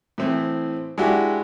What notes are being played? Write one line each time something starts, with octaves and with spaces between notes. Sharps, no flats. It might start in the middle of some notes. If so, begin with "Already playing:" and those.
A2 E3 C4
G#3 D4 E4 F#4 G4